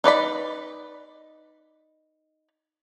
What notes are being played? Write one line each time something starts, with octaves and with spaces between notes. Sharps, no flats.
D#4 B4 D5 B5